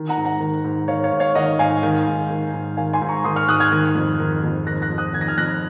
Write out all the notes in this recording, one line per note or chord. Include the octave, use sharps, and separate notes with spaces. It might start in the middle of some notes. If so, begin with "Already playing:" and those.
Already playing: D#3
F#5 A#5
G#2
F#5 A#5
D#3
G#2
D#3 C#5 F5
C#5 F5
G#2
C#5 F5
D#3 D#5 F#5
G#2 F5 G#5
D#3
G#2
D#3
G#2
D#3 F5 G#5
G#5 C6
G#2
A#5 C#6
D#3 C6 D#6
C#6 F6
G#2 D#6 F#6
F6 G#6
D#3
F2
D#3
F2
D#3 F#6 A#6
F#6 A#6
F2
D#6 F#6
D#3 G#6
A#6
F6 G#6
F2 F#6 A#6